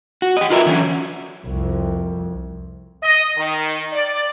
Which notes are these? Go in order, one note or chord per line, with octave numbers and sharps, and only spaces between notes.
F#4
G4 D#5
F4 F#4 A#4 B4 D#5 E5
D3 E3 F#3 C4 C#4
C2 F2
D#5
D#3
D5